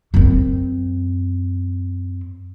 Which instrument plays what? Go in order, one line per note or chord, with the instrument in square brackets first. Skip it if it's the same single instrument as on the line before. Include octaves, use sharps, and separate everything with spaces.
[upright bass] F#2 C4